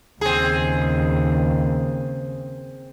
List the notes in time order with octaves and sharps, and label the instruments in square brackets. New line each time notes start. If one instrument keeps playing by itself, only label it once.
[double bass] D#2 C#3 [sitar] C4 G#4